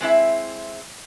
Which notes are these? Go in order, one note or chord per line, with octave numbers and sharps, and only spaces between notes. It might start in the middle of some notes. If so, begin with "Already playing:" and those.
G#3 C4 E4 E5